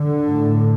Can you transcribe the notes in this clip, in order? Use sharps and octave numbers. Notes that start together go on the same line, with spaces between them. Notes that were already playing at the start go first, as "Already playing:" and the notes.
Already playing: D3
A2